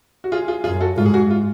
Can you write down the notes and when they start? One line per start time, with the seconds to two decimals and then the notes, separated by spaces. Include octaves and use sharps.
0.24 F#4
0.32 F4 G#4
0.48 F4 G#4
0.64 F#2 F4 G#4
0.81 F#4 A4
0.97 G#2 F4
1.06 G#4
1.14 F#4
1.30 F4